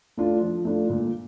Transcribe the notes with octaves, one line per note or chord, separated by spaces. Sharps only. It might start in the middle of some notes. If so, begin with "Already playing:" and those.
A3 D4 F4
F3
A3 D4 F4
A#2